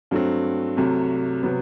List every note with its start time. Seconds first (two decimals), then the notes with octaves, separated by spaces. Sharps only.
0.11 G2 F#3 A3 C4
0.77 C2 C3 F#3 A3
1.43 C3 F#3 B3